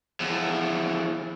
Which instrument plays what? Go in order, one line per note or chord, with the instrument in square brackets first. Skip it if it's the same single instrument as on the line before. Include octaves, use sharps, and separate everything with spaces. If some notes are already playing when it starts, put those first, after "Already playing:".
[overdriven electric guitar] E2 F3